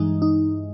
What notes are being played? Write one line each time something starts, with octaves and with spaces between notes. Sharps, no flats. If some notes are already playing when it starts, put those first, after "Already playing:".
Already playing: G2 E3 G#3 D#4
D#4